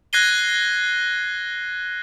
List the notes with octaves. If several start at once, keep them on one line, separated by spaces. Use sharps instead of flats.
F#6 G#6 A#6 C7 D#7 G7